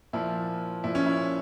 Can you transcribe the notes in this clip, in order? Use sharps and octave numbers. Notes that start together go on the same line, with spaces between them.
A#2 F3 E4
A#2 F3 E4
C#4
E4